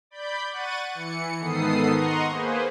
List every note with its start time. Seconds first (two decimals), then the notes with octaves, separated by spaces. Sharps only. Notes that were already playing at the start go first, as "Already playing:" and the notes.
0.11 D5 B5 G6
0.50 F#5 C#6 F#6 A6 D#7
0.91 E3 C#7
1.40 G#2 D#3 B3 A4 D#6 C7
1.91 D#5 F#5 A#5 C6 C#6 D#6
2.28 A#3 G#4 B4 C5